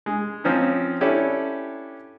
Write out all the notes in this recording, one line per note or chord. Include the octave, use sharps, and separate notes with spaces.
G#3
F3 C4 C#4 D#4
C#4 D4 E4 G4 A4 C#5